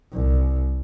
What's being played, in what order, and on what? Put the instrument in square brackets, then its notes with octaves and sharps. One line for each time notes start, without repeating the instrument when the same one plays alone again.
[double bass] C2